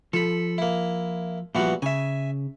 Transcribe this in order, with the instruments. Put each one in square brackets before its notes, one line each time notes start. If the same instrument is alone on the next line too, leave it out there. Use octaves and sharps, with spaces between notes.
[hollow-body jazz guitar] F3 [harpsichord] A4 B5
[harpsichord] A#3 E4
[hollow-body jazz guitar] A#2 F3 G3 [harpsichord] E3 B3 F#4
[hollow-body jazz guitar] C#3 [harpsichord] E5 G#5